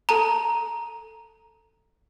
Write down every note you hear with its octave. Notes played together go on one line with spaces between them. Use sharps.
A4 A5 A#5